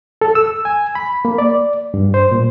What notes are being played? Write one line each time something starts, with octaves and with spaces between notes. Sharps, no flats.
A4
E6
G#5
B5
A#3
D5
G2
C5
A#2